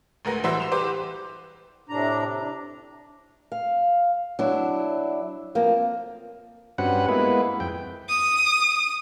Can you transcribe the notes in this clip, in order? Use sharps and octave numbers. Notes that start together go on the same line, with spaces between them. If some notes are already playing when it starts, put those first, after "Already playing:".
G#1 D2 A#4 B4 A#6
C2 E3 F#4 C5 E5 E6
C6 E7 F7
G4 B4 C5 D6
A2 C3 D4 A#5
D4
F5
F#3 D4 E4
F3 A#3 C4
G2 C4 C#4 F#4 B4 F#5
G#3 A#3 B3 E4 B4
F2 G5
D#6